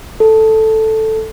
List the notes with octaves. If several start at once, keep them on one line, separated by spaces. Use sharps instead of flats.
A4